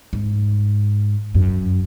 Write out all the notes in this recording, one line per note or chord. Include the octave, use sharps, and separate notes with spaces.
G#2
F#2